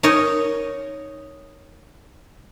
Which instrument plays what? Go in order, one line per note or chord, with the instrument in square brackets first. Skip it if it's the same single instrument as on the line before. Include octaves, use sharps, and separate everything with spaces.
[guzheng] D#4 A#4 C#5 D#5